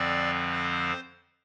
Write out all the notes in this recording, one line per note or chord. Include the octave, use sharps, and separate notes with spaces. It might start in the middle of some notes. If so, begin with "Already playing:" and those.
Already playing: F2 D3 F3 C4 D5
C5